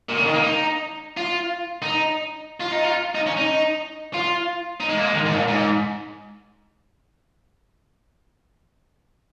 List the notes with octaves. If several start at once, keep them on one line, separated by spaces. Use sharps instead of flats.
A#2
C#3
D#3
A#3
D#4
F4
D#4
F4
D#4
F4
D#4
C#4
D#4
F4
D#4
G#3
A#3
G#3
D#3
G#2
C#3
A#2
G#2